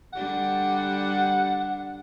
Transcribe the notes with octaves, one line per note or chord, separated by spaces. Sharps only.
D3 G3 D4 F#5